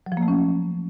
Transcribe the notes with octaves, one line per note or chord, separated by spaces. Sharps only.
F#3
F3
A#3
A3
C#4